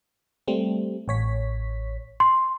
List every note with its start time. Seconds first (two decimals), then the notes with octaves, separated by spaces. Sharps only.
0.48 G3 A3 C4
1.08 A1 C#5 B6
2.20 C6